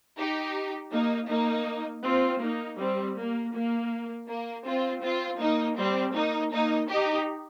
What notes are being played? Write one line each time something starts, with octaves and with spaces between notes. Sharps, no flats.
D#4 G4
A#3 D#4
A#3 D#4
C4 F4
A#3 D#4
G3 C4
A#3
A#3
A#3
C4 F4
C4 F4
A#3 D#4
G3 C4
A#3 D#4
A#3 D#4
D#4 G4